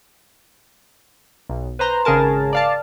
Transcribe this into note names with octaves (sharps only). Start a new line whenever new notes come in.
B1
B4 C5 A#5 C6
G#1 C#3 G#4 A#4 A5
D5 F5 A5